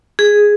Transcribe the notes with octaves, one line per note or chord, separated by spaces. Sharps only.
G#4